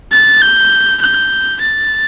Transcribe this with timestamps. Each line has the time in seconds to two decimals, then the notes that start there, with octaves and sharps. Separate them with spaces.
0.12 A6
0.42 G6
1.02 G6
1.61 A6